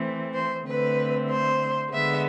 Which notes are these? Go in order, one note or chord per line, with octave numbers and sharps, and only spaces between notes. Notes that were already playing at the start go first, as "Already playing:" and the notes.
Already playing: E3 A3 C4
C5
D3 A3 C4 B4
C5
D3 G#3 B3 E5